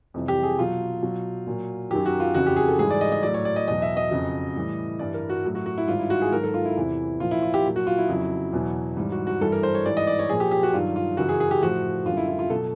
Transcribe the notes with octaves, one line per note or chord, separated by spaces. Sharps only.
F2 C3 E3 G3
G4
G#4
B2 F#3 F4
B2 F#3
A#2 F#3
F#2 D#3 F#3 G4
F#4
F4
F2 C#3 E3 F#4
G4
G#4
A4
G#2 E3 G3 G#4
D5
D#5
D#5
A2 F#3 D5
C#5
D5
D#5
E2 B2 F#3 D#5
E5
D#5
F2 C#3 F#3
A2 E3 G3
G2 E3 G3 D5
A#4
F#4
A2 F#3
F#4
F#4
E4
G#2 D#3 G3 F4
E4
F#4
G#4
G#2 D#3 F#3 A#4
A4
F4
E4
E2 C3 E3
A#2 F3 F4
E4
F4
G4
A#2 F#3
F#4
F4
E4
F2 C#3 F#3
E2 B2 F#3
G#2 E3 G3
F#4
F#4
G2 E3 G3 A4
A#4
C5
C#5
G#2 E3 G3 D5
D#5
D5
C#5
A#2 F3 G#4
G4
G4
F#4
G2 D#3 F#3 F4
F4
F#2 C#3 E3 F#4
G#4
G#4
G4
A2 F3 F#4
F#2 D3 G3 F4
E4
E4
F4
B2 F#3 A4